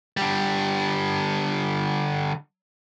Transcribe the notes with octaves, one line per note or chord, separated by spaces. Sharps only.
D3 G3